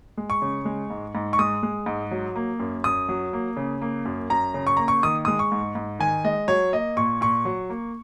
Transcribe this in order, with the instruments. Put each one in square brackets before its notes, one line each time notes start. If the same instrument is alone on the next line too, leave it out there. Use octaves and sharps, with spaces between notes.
[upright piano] G#3
C#6
C#3
G#3
G#2
G#2
C#6
G#3 D#6
G#3
G#2
F#3
A#3
F#2
F#2 D#6
F#3
A#3
C#3
A#3
F#2
F#2 A#5
C#3
C#6
A#3 A#5
C#6
D#3 D#6
G#3 D#6
C#6
G#2
G#2
D#3 G#5
G#3 D#5
F#3 C#5
A#3 D#5
A#2 C#6
A#2 C#6
F#3
A#3